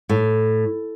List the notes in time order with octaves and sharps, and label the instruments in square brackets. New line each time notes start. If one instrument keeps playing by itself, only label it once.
[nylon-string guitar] A2